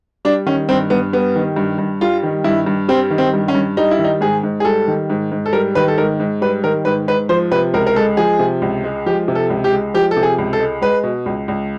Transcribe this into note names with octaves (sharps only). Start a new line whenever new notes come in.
G3 D4
D#3 C#4
G2 C4
G2 B3
G3 B3
D#3
G2
G2
G3 F4
D#3
G2 E4
G2
G3 C4
D#3
C4
G2
C#4
G2
G3 D#4
E4
D#3
D#4
G#2 G#4
G#2
G#4
G3 A4
D#3
G#2
G#2
A4
G3 A#4
D#3 B4
A4
G#2 A#4
G#2
G3 B4
D#3 A#4
G#2 B4
G#2 B4
F3 C5
C3 B4
C#2 A#4
A#4
G#3 A4
F3 G#4
C3
C#2
G#3
F3 G4
C3
A4
C#2
G4
G#3
F3 G4
A4
C3
G#4
C#2
A4
G#3
G#3 B4
B2
C#2
C#2